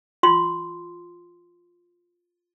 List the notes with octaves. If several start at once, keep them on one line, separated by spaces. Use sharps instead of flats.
F4 C6